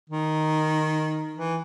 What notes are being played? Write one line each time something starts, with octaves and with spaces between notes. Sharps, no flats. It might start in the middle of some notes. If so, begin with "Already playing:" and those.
D#3
E3